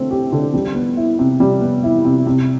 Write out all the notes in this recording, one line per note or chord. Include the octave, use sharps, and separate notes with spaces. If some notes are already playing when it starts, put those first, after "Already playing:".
Already playing: D3 A3 C4
G4
D3
G3
B3
E4
C3
G3
B3
E4
C3
C3